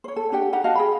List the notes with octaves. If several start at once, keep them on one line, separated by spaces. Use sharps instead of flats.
C5 C#5
A4
D4 G4 F#5 G5
D#4 G4 F#5 A#5
F#4 D#5 F5 A5
G#4 G5 B5